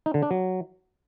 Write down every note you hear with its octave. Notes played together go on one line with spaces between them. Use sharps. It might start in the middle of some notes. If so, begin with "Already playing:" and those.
D#4
D3
D4
F#3